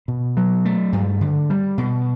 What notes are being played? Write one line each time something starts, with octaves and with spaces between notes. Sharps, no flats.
B2
F#3
A3
G2
D3
G3
B2